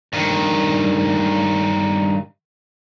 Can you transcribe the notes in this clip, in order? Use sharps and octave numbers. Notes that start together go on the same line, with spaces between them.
G2 D#3